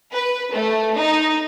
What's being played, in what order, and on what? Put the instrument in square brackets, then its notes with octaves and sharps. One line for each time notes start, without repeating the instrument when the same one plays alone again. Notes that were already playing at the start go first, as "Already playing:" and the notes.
[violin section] B4
A3
D#4